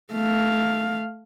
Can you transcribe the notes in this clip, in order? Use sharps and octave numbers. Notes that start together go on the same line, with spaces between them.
A3 F5